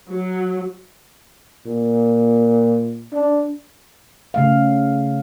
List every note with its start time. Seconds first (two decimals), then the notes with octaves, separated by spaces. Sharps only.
0.11 F#3
1.66 A#2
3.13 D4
4.34 C#3 A3 F5